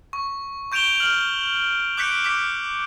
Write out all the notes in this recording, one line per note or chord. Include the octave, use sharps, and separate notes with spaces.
C#6
C#6 G6 D7 E7 F7 G7
F6 F#7
D6 F#6 G6 B6 C#7 D7
D6 B6